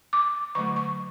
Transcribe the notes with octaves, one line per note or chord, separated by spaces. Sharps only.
D6
D3 F#3 A3 C#6
C#6